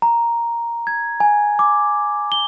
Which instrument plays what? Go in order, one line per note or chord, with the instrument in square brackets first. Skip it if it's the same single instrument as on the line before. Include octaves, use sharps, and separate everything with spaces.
[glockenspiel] A#5
G#6
G#5
D6
G7